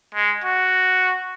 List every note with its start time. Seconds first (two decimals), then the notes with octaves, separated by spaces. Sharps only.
0.15 G#3
0.44 F#4